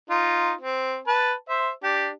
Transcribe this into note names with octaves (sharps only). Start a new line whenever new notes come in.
D#4 F4
C4
B4 A5
C5 E5
D4 G4